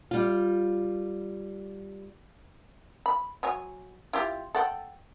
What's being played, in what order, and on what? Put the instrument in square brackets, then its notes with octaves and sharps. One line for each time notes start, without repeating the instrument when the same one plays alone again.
[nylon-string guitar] G3 F4
[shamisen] B5
F#3 C#5 G#5
E4 F4 G4
A4 F#5 G5